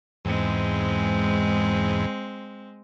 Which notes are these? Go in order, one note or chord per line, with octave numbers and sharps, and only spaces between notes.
E2 G#2 G#3 C4